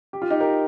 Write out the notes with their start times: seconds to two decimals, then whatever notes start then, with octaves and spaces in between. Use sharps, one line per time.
0.13 G4
0.22 F4
0.30 D#4 G4
0.40 G4 A#4